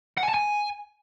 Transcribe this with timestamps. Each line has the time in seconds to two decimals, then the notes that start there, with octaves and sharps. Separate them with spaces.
0.18 F#5
0.23 G#5
0.29 A5
0.34 G#5